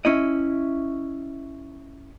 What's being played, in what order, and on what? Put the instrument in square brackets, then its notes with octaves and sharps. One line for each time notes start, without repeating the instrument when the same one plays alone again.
[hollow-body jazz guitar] C#4 E4 D#5